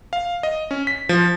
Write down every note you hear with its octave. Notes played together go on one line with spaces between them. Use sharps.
F5
D#5
C#4
B6
F3